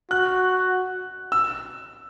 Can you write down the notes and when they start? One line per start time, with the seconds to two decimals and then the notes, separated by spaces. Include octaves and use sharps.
0.11 F#4 F#6
1.32 E6